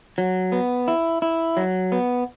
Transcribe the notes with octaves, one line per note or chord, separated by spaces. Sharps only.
F#3
B3
E4
E4
F#3
B3